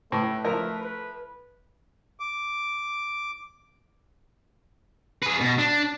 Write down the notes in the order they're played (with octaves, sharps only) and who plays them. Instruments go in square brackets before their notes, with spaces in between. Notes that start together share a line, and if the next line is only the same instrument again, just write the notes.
[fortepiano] A2 [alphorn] A3 [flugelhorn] B4
[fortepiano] F3 E4 A#4
[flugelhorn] B4
[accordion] D6
[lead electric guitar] G#4 B4
B2
D4